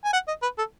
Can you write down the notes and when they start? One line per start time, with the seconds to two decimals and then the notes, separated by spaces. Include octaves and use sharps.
0.05 G#5
0.13 F#5
0.28 D#5
0.42 B4
0.58 A4